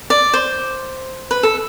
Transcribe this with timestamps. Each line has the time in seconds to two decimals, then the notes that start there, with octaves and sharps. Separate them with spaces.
0.10 D5
0.34 C5
1.31 B4
1.43 A4